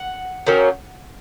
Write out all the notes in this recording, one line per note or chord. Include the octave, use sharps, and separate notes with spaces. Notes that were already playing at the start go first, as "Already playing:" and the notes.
Already playing: F#5
D#3 F#3 A#3 C#4